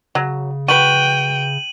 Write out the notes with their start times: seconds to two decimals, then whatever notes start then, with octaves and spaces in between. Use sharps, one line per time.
0.15 C#3 F#3
0.68 F#4 B4 G5 D#7 F#7